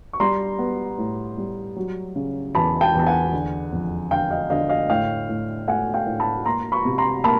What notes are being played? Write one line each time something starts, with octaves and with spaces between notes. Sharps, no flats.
C#6
G3 A#5 C6
B3
A2
G3
F#3
C#3
E2 A5 B5
G5 A5
E2
A5
F#5 G#5
D3
F2
D3 F5 G5
D#5 F5
D3 D#5 F5
D#5 F5
A2 F5 G5
A2
A3 F#5 G#5
F5 G5
A2
A5 B5
A#3 A#5 C6
B5 C#6
C3
A#5 C6
A#3 A5 B5